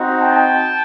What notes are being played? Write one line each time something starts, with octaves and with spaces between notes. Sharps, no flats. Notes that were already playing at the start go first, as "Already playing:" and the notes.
Already playing: C4 D#4 F#4
G5 A5